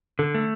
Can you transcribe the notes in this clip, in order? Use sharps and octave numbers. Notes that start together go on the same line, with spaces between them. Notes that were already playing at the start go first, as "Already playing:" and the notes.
D3 A4
A3